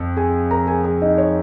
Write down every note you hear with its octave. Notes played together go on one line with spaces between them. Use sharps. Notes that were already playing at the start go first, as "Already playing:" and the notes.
Already playing: F2
G#4 G#5
A#4 A#5
G#4 G#5
G#4 G#5
D#4 D#5
C#5